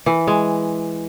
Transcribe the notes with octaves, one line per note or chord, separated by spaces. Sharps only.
E3
G#3